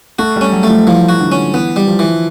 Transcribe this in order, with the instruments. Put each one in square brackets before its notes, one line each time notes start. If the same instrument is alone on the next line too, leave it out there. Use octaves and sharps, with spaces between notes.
[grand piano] A3 [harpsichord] F#4
[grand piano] G3 [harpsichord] C#4
[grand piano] F#3
[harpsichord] A3
[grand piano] F3
[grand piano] E3 [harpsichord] F3
[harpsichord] F#4
[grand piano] D3
[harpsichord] C#4
[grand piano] E3 [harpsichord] B3
[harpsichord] G3
[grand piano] F3
[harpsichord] E3